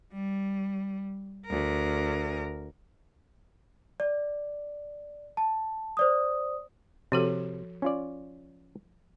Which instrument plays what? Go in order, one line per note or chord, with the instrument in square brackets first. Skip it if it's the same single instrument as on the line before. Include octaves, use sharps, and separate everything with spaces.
[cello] G3
D2 A#4
[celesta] D5
A5
C5 D5 D#6
[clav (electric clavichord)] C3 [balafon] F3 F#4 A4
[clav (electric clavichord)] C#4 F4 D5